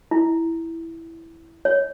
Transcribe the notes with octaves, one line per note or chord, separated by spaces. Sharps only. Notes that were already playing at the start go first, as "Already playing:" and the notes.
E4
C#5